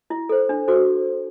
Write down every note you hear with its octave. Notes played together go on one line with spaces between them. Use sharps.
E4
A4 C5
D4
F#4 A4 C5